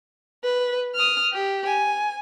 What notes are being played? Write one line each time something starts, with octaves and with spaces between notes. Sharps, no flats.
B4
D#6 F6
G4
G#5